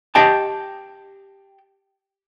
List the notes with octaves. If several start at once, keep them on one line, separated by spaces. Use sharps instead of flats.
G4 D#5 G5 A5